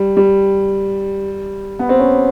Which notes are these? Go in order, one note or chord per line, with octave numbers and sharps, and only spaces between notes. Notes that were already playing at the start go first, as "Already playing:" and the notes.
Already playing: G3
G3
B3
C4
C#4